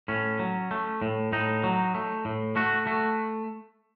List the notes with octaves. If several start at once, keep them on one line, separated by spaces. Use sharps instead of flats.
A2 C#4
F#3
A3
A2
A2 D#4
F#3
A3
A2
A3 F#4
A3 F#4